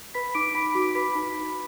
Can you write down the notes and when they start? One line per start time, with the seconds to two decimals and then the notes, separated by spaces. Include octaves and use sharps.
0.14 B4 B5 B6
0.35 D#4 D6 D7
0.50 D7
0.55 D#4 B5 B6
0.75 F#4 D6 D7
0.95 B4 B5 B6
1.15 D#4